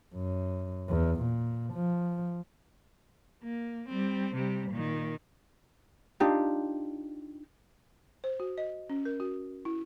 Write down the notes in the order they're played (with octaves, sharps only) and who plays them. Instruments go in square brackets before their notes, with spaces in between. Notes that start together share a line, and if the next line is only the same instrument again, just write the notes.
[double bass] F#2
E2
A#2
F3
[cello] A#3
G3 C4
C3 G3
A#2 D#3
[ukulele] D4 D#4 F4 G4
[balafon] C5
F#4
D#5
C#4
A#4
F#4
E4